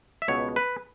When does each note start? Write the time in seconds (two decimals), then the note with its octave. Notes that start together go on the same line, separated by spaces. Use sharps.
0.22 E5
0.28 C#2 B2 B3 C#5
0.56 B4